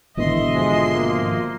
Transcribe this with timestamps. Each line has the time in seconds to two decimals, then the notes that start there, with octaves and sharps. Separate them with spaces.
0.17 G#1 B2 D3 E3 D#5 E5 C6
0.55 F3 G#3
0.94 A#3